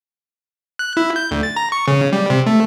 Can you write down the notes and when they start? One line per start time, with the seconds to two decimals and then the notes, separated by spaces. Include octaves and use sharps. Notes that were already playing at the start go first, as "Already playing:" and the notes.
0.79 F#6
0.97 E4
1.16 G6
1.31 D2
1.43 A6
1.56 A#5
1.72 C#6
1.88 C#3
2.13 G3
2.30 C3
2.46 A3